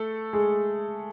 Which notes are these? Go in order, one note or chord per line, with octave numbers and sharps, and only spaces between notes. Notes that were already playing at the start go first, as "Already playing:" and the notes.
Already playing: A3 A4
G#3 G#4